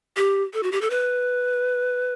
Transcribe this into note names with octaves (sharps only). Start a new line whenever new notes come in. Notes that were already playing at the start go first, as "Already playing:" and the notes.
G4
A4
F#4
G4
A4
B4